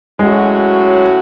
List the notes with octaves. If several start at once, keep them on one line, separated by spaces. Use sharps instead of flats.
A2 F#3 G#3 C#4 F#4